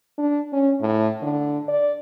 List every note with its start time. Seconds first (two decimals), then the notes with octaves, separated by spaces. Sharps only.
0.18 D4
0.52 C#4
0.82 A2
1.22 D3
1.68 D5